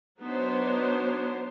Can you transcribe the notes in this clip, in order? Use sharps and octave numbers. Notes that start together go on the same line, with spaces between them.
F#3 B3 D4 D#4 C5 C#5